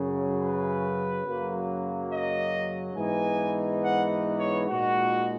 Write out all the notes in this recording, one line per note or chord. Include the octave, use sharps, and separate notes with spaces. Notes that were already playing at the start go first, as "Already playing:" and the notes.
Already playing: F#2 C#3 F#3
B4
F#2 C#3 F#3 A#3
D#5
G#2 E3 B3 D#4 G#5
F#5
C#5
A#2 G#3 D#4 F#4